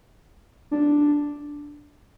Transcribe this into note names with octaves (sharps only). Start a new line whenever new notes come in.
D4